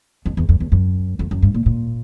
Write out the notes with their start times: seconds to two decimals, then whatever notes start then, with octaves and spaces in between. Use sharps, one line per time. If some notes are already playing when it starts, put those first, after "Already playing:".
0.26 F2
0.37 E2
0.49 F2
0.60 E2
0.72 F#2
1.19 F2
1.31 F#2
1.42 G2
1.54 A#2
1.66 A#2